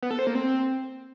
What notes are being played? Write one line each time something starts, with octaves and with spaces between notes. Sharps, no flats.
B3
A4
C5
A#3
C4